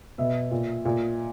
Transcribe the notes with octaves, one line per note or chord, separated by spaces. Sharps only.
B2 E5
A#2
A#2